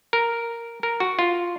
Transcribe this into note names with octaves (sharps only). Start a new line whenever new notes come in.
A#4
A#4
F#4
F4